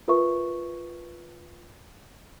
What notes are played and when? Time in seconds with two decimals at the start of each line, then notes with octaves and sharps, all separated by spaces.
0.08 F4 A#4 B4 E5 C#6